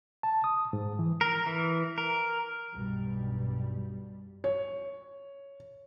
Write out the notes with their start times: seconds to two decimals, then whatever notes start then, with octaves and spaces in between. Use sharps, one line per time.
0.23 A5
0.44 D#6
0.73 G#2
0.99 E3
1.21 A#4
1.46 E3
1.98 A#4
2.73 B1 G2 B2 G3
4.44 C#5